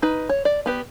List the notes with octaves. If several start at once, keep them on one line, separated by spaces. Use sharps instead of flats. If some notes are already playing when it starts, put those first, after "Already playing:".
D#4 B4
C#5
D5
B3 G4 B4